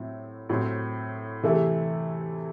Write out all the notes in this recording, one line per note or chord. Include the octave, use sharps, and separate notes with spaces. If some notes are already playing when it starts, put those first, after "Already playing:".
Already playing: A2 F#3 C4 E4
A2 F#3 C4
C3 E3 A3 E4